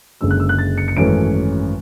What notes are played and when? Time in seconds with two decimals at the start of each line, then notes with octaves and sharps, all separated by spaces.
0.21 F#1 F#2 D3 G#3 E6
0.30 F#6
0.40 E6
0.49 F#6
0.58 A6
0.78 C#7
0.88 C#7
0.97 G#1 F#2 E3 A3 C#4 D7